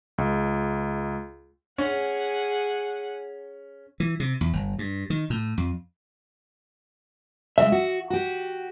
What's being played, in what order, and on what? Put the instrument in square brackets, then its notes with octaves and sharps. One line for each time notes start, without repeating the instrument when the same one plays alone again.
[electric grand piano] C#2
[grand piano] C#4 [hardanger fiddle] G#4 F#5
[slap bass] E3
C3
E2
G1
G2
D#3
A2
F2
[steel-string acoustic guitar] C#3 G#3 [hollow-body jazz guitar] E5
[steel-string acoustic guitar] F#4
F#4 G4